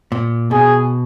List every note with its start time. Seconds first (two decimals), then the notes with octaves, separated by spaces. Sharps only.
0.12 A#2
0.51 B2 G#4